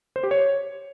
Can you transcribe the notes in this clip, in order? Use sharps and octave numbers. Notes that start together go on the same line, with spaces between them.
C5
G4
C#5